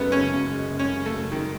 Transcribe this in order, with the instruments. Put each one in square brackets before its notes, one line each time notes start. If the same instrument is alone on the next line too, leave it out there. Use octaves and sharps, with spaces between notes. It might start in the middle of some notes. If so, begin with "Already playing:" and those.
Already playing: [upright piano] F#2 G#3 [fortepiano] A3 B3
[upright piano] C#3 [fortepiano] C#4
[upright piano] F#2
G#3
F#2
[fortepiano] C#4
[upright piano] C#3
[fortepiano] A3
[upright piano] F#2
[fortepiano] D#3 [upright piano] G#3